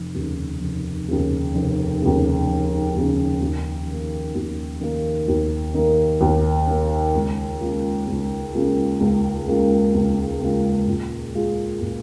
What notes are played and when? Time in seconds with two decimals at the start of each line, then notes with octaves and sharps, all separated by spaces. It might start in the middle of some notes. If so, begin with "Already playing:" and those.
Already playing: F1
0.15 D#2 C#3
0.61 F1
1.08 D#2 C#3
1.55 F1
2.02 D#2 C#3
2.47 F1
2.95 D#2 C#3
3.41 D#2
3.87 D#3 A#3
4.35 D#2
4.81 D#3 A#3
5.28 D#2
5.74 D#3 A#3
6.21 D#2
6.67 D#3 A#3
7.15 C#2
7.61 C#3 A#3 F4
8.07 C#2
8.55 C#3 A#3 F4
9.00 C#2
9.47 C#3 A#3 F4
9.94 C#2
10.41 C#3 A#3 F4
10.87 A#2
11.34 G#3 F4 G#4
11.81 A#2